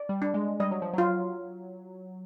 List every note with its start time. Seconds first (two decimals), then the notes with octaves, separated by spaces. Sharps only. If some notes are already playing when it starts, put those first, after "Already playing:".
Already playing: D5
0.09 G3
0.22 D4
0.34 G#3
0.60 G3 D#5
0.71 F#3
0.82 F3
0.93 F#3 F4